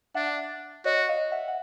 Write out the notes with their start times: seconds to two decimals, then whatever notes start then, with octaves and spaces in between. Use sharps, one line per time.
0.15 D4 E5 F#5
0.85 F#4 C#5 D#5
1.09 D#5 F5
1.32 E5 F#5
1.48 F#5